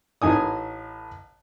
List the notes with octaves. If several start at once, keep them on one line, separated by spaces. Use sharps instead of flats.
A1 A2 D#4 G#5 D#6